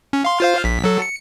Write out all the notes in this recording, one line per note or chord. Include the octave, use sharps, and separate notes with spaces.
C#4
F5 C6
F4 C5 F5
A#1 B6
F#3 A4
C#7